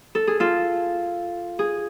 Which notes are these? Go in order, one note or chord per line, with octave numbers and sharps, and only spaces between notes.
A4
G#4
F4 A4
G#4